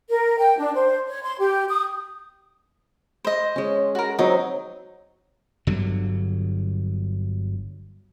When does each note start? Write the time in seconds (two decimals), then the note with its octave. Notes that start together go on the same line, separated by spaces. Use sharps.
0.09 A#4
0.39 G5
0.57 D4
0.73 C5
1.06 C#5
1.22 C6
1.38 G4
1.67 D#6
3.25 C5 D#5
3.56 G#3 C#4
3.95 F#4 A#4
4.19 F#3 C4 D#4 D#6
5.67 G1 G2 D3 F#3